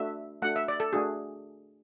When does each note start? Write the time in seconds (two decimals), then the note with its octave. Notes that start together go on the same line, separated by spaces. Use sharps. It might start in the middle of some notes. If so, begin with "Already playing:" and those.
Already playing: A3 D4 F#4 E5
0.42 A3 D4 F#4 F#5
0.56 E5
0.68 D5
0.80 A4
0.93 A3 D4 F#4 G#4